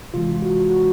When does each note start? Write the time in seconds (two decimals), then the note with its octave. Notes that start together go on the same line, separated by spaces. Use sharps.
0.14 C3 E3 G#3 F4
0.42 F#4
0.70 F#4